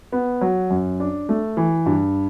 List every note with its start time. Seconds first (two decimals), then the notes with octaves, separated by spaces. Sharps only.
0.12 B3
0.41 F#3
0.70 F#2
1.00 D4
1.29 A3
1.57 E3
1.86 G2